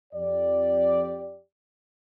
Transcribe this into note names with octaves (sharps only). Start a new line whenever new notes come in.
F2 G4 D5